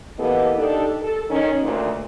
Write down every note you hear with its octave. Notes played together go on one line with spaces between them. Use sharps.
E3 A#3 B3 G4 A4 D#5
D4 D#4 G4 A4
A4
D#3 C#4
D2 A#2